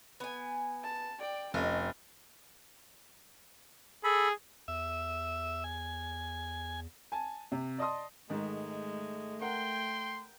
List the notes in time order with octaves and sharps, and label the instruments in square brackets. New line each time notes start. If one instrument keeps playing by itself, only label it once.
[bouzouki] B3 G#5
[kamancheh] A5
D5 G5
[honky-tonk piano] F1 [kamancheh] C#4 [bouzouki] D#5 G5
[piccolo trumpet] G#4 [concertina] A4 B5
[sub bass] E2 [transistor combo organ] E5
[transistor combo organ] G#5
[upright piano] G#5 A5
C3
D5 D#5 A5 C6 D#6
[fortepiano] G#2 D#3 [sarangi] G#3 [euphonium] A3
[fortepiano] A#4 F#5 [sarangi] G5 [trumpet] C6